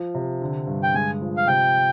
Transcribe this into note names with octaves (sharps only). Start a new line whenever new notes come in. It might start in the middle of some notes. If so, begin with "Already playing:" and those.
Already playing: F3
C3
D3
G2
G5
G#3 G#5
F3
F5
C3 G5